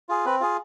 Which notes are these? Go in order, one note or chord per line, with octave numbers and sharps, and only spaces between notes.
F4 G#4
C4 B4
F4 G#4